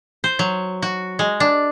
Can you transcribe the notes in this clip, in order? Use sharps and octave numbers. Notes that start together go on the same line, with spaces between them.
C5
F#3
F#4
G#3
D4